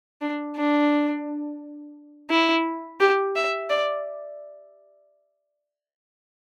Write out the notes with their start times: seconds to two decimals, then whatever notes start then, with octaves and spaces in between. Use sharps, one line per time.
0.21 D4
0.56 D4
2.30 E4
3.00 G4
3.36 E5
3.70 D5